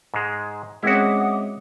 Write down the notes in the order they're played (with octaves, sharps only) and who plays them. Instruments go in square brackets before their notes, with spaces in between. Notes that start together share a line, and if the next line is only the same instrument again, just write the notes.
[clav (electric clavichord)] G#2 G#3
[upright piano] G#3 C4 C#4 [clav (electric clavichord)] E4 F#4 [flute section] F#5 D6 D#6